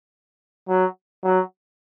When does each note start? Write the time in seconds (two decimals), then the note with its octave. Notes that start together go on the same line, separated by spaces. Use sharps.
0.69 F#3
1.24 F#3